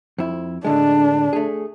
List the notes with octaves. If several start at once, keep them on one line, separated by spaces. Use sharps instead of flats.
F2 E4
A2 D3 G#3 D4
A3 G#4